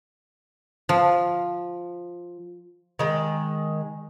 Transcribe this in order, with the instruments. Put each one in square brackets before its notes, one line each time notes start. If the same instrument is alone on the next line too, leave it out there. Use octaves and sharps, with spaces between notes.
[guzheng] F3
[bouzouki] D#3 G#3